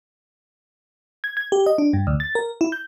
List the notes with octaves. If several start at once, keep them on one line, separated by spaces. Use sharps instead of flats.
G#6
G#6
G4
D#5
D4
G2
D2
A6
A#4
E4
G6